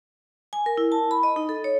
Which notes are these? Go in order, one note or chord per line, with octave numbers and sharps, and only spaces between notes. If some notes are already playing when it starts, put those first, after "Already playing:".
G#5
A#4
E4
A5
B5
D#5
D#4
A4
C#5